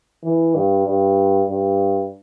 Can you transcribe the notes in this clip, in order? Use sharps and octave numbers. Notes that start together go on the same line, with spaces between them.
E3
G2
G2
G2